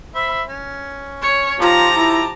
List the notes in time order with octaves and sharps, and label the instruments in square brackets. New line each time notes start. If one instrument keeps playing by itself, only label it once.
[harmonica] C5 E5 B5
C#4
[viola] C#5
[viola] F3 A#5 [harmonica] D#4 G4 A5 [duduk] F4
[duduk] E4